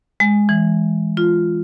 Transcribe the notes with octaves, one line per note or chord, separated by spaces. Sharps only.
G#3
E3
F4